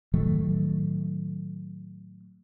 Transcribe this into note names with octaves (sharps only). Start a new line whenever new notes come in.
A2 D#3 F#3 A3